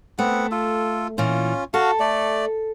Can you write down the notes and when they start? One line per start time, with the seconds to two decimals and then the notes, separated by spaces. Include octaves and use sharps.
0.19 A3 B3 C4 F#5
0.51 F4 A4
1.18 A#2 E3 C#4 F4
1.74 F#4 A4 F5
2.00 A3 D5